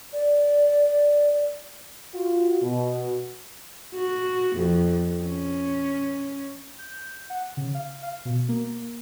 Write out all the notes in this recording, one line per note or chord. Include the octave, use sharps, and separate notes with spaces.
D5
F4 F#4
B2
F#4
F2
C#4
G6
F#5
C#3
F5
F5
B2
A#3